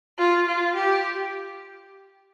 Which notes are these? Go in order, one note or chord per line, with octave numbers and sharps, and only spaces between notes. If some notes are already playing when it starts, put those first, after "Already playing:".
F4
F4
G4